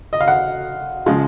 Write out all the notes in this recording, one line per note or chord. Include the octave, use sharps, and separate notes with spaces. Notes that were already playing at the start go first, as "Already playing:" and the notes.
D#5
F5
F#5
C#3 F3 G#3